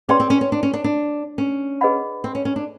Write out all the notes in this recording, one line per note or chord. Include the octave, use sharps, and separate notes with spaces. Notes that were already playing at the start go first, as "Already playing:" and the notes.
C#4 G#4 B4 D5 G5 C6
C4
C#4
C#4
D4
C#4
D4
D4
C#4
G#4 B4 D#5 F#5 B5
C4
C#4
C#4
D4